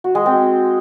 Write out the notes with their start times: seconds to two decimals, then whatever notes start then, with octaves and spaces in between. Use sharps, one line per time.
0.04 F#4
0.15 G#3
0.26 C4